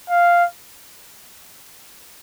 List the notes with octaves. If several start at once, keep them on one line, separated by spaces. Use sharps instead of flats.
F5